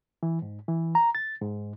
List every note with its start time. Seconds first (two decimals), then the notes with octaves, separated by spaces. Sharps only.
0.23 E3
0.42 G#2
0.68 E3
0.95 A#5
1.15 A6
1.41 G#2